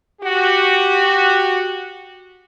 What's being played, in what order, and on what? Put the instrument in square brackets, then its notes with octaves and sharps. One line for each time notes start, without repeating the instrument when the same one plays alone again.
[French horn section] F#4 G4